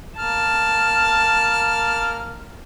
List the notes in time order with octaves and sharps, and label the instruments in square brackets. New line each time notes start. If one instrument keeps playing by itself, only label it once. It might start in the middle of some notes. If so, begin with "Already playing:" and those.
[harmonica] A#3 F6 [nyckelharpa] A5